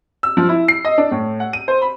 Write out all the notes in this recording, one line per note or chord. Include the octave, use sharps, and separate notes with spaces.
E6
F3
E4
C7
D#5
D4
A2
F#5
D#7
C5
B5